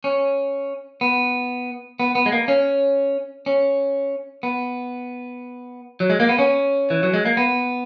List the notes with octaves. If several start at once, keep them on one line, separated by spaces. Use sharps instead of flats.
C#4
B3
B3
B3
G#3
A#3
C#4
C#4
B3
F#3
G#3
A#3
B3
C#4
E3
F#3
G#3
A#3
B3